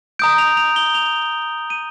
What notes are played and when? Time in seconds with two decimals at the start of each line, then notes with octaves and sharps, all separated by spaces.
0.19 A#5 D#6 G6 D7
0.38 F7
0.57 F7
0.76 G7
0.95 F7
1.70 D#7